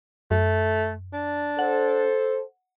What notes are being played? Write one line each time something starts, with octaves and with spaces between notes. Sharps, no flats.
F#2 A3
D4
A4 C5 F#5